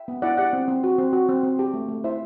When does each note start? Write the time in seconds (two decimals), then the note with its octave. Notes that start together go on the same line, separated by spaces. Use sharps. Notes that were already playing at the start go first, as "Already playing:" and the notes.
Already playing: E5 G5
0.08 B3
0.22 E4 D5 F#5
0.37 G4 D5 F#5
0.53 C4
0.68 C4
0.84 F#4
0.98 C4
1.13 F#4
1.29 C4
1.43 C4
1.59 G4
1.74 A3
1.89 A3
2.04 E4 C5 E5